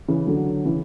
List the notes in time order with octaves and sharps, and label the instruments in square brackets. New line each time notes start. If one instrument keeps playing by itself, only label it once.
[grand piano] C#3 E3
D3 F#3
C#3 E3